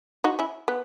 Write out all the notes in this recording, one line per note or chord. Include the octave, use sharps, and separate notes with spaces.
D#4 F#4
C#4 E4
B3